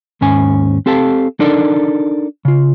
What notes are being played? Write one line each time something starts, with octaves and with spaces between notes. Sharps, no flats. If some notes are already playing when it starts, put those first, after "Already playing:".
D#2 G#2 C#4 G#5
C4 G4 A4 F5 A5
D4 D#4 A4 A#4 D5
C#3 F4